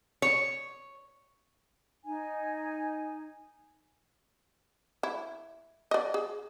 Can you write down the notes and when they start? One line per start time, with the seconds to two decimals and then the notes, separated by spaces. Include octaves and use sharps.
0.22 C#5
2.05 D#4 G#5
5.03 E4
5.91 D5 D#5
6.14 G#4